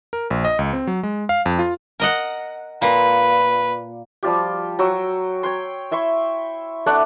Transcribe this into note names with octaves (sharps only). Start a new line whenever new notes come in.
A#4
A#1
D#5
C#2
C4
F#3
G#3
F5
F2
F4
A#4 D#5 F#5
A#2 B4
F3 G3 F4 G4
F#3 G5 C#6 E6
C#5 G5 C6
E4 E5 C6 C#6
A3 D4 D5 F#5